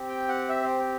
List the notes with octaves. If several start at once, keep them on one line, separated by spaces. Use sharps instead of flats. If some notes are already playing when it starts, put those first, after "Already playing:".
Already playing: C4 G4
G5
F#5
E5
C5